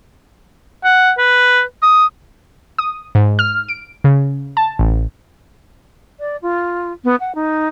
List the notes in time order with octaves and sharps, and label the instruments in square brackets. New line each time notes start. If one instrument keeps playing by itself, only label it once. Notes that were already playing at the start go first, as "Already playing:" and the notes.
[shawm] F#5
B4
D#6
[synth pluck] D#6
G#2
F6
D7
C#3
A5
A1
[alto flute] D5
F4
B3
F#5
D#4